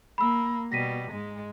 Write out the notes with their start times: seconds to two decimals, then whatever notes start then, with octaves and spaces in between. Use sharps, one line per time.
0.18 A#3 B5 E6
0.72 B2 G3 A#6 B6 D#7
1.12 G#2 G#3